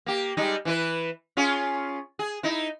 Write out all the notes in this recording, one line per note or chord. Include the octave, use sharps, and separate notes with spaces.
A#3 G4
G3 G#3 D#4
E3 E4 B4
C#4 F4 G#4
G#4
D#4 E4